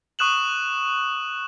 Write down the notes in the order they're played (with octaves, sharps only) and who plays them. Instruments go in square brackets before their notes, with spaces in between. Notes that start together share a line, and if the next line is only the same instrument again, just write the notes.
[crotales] C#6 D#6 F#6 E7 F#7